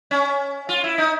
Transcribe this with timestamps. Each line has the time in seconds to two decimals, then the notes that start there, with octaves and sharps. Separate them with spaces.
0.11 C#4
0.69 F4
0.84 E4
0.98 D#4